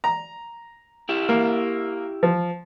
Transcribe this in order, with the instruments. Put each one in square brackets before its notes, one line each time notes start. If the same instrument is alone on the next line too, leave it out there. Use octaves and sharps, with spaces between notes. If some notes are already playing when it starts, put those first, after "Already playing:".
[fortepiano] A#5
[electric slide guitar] E4 G4 E5
[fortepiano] A#3
F3